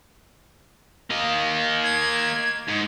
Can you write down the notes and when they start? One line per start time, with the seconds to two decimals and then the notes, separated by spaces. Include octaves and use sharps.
1.10 A#3 D#5
1.84 G#6
2.68 G#2